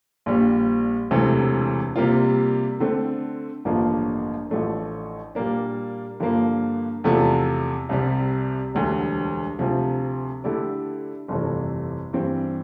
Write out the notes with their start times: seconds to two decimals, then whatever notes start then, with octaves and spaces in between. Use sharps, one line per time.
0.26 A#1 A#2 G3
1.11 E1 D2 C3 E3 A3
1.96 C3 G3 A#3 F4
2.80 D3 A3 C4
3.65 A1 G2 D3 F3 A#3
4.50 A1 A2 F3 A3 D4
5.35 A#2 G3 A#3 D4
6.20 G2 D3 F3 A#3
7.04 E2 C3 F3 A3
7.89 C2 C3 G3
8.74 E1 D2 D3 G3
9.59 D2 C3 F3
10.44 D3 A3 E4 G4 D5
11.28 G1 F2 C3 E3 A3
12.13 G2 E3 G3 C4